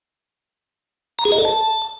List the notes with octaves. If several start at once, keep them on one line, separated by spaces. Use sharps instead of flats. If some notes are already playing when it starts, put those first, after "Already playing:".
A#5
G#4
D#5
A4
A5